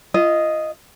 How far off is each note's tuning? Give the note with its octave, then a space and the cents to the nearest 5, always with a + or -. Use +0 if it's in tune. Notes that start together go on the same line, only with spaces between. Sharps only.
F4 -30 D#5 +0